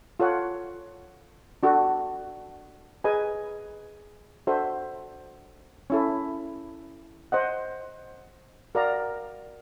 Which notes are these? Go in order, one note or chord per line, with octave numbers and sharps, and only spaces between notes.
F4 A4 C#5 F#5
D4 F#4 A4
G#4 B4 D#5 G#5
D4 F#4 A4 C5 E5
C#4 E4 A4
C5 D#5 F#5
F#4 A#4 D5 F5 A#5